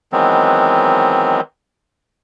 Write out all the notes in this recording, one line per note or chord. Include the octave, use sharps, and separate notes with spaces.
D#3 E3 F#3 G#3 B3 C4